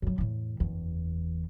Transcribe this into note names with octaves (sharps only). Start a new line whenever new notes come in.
F#2 F#3
E2 A2
F#1 E2